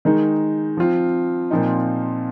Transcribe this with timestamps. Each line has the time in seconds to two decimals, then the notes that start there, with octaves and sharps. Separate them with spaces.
0.05 D#3 G#3 D#4
0.77 F3 C4 F4
1.51 A#2 F3 C4 D#4